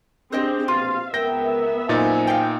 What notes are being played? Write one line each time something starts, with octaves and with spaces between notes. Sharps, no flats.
C4 D4 G4 G#4 C5 D#5 G5
A#1 B2 F4 F5
C#2 B3 A#4 E5 G5 A#6
F#2 A#2 D#4 C5 G#5 A6
F5 G5